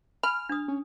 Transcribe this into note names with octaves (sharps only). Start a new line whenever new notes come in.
G#5 B5 F6
D4 D#6
C#4